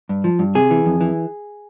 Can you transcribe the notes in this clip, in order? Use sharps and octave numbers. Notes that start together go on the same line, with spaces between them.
G2
F3
G2
C3 G#4
E3
F2
E3